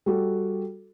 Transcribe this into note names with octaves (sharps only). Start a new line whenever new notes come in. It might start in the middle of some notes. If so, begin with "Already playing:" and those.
G3 F#4 A4